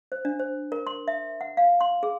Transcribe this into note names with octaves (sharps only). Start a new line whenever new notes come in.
C5
D4
C5
A#4
C6
E5
F#5
F5
C6
G#4